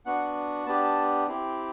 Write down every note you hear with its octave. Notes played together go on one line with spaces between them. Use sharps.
B3 D4 F#4 F#5
B3 D4 G4 A5
C4 E4 G4